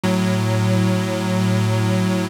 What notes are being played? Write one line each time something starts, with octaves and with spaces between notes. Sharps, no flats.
A2 F#3